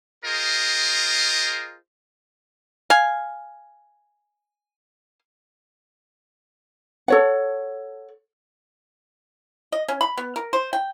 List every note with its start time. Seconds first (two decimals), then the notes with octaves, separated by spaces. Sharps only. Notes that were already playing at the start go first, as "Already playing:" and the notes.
0.24 F4 G#4 A#4 C5 D#5
2.90 F5 G#5
7.08 A4 C#5 F#5
9.72 D#5
9.88 C#4
10.01 B5
10.17 B3
10.36 A#4
10.53 C5
10.73 G5